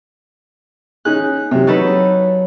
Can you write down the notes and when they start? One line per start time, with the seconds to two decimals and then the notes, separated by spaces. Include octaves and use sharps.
1.05 C#4 D#4 G#4 F#6
1.51 C3 F#3
1.67 F#3 D#4 A4 B4